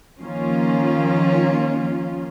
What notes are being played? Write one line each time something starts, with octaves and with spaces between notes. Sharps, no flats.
D#3 F3 A#3 C#4 F4